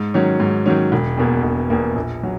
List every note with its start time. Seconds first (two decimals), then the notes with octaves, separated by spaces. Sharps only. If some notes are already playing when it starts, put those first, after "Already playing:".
Already playing: G#2
0.14 D#3 F#3 C#4
0.40 G#2
0.66 D#3 F#3 C#4
0.92 E1
1.17 E2 B2 A#3
1.43 E1
1.70 E2 B2 A#3
1.96 A#1
2.23 F#3